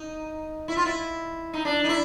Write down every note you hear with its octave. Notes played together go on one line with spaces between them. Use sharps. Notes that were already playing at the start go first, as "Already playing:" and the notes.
Already playing: D#4
E4
F4
E4
D#4
D4
D#4
E4